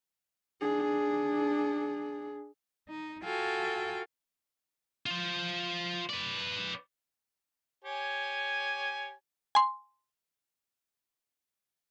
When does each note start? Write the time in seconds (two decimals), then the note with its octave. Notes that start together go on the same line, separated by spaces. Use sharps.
0.61 D4 G#4
2.88 D#4
3.23 F4 F#4 A4 F5 G5 G#5
5.06 F4 C5
6.10 B4 D5
7.84 G4 C#5 G#5
9.55 G#5 C6